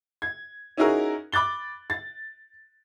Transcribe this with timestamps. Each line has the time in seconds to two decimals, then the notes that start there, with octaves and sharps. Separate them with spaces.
0.22 G#6
0.77 C#4 D#4 E4 F#4 G#4 A#4
1.32 B5 D6 F#6 A6 G7
1.90 A6